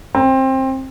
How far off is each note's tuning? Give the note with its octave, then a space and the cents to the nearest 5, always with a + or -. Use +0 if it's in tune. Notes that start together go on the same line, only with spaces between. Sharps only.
C4 +20